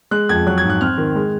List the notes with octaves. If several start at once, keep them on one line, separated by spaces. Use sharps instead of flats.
G#3 F#6
F2 G#6
F#3 F#6
G#6
G#2
F#6
C4 F6
D#3
G#3